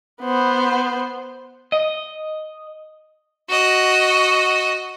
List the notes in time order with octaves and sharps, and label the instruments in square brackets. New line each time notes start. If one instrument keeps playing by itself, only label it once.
[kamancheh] B3 C5
[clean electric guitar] D#5
[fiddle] F#4 D#5